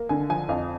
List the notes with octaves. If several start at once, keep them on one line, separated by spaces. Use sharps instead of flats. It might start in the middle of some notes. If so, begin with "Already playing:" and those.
Already playing: A#3
D3 G#5
F3 G#5
F2 F5